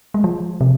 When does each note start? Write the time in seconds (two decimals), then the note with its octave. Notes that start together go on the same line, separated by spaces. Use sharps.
0.14 G#3
0.24 F3
0.61 C3